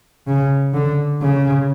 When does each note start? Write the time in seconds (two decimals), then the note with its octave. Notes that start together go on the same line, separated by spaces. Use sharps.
0.27 C#3
0.74 D3
1.21 C#3